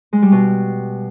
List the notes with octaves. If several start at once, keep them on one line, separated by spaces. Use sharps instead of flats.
G#3
G3
B2